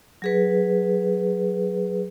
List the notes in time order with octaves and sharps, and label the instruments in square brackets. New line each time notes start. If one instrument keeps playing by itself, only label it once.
[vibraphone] F#3 G#4 B4